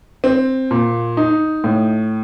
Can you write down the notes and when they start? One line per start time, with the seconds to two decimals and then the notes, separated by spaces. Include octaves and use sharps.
0.24 C4
0.71 A#2
1.17 D#4
1.64 A2